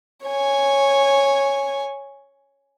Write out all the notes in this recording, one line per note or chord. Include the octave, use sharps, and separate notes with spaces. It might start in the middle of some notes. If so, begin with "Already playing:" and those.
C#5 G#5